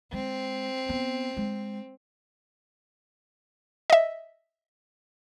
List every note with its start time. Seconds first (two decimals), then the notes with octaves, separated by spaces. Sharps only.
0.13 G#3 C4
0.89 B3
1.37 G#3
3.90 D#5 E5